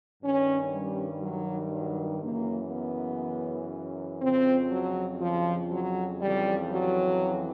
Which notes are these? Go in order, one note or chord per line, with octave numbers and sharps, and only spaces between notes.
G2 D#3 C#4
G3
F#3
F#3
F#2 C#3 E3 A#3
B3
F2 C#3 F3 C4
F#3
F3
F#3
F2 C#3 E3 G3
F#3